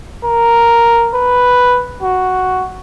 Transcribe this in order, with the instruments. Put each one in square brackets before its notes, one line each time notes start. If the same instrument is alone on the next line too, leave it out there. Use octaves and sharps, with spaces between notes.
[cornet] A#4
B4
F#4